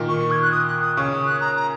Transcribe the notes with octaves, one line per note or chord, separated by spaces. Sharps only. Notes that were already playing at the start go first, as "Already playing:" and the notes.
Already playing: A#2 D#3
C#6
G#6
F#6
D#6
F#6
D#6
C#3 C#6
D#6
F#6
A#5
A#5